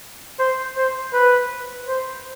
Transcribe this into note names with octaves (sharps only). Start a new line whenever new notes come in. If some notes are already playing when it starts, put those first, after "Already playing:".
C5
C5
B4
C5